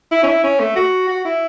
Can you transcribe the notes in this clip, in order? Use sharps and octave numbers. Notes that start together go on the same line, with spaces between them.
E4
C#4
E4
C#4
A3
F#4
F#4
E4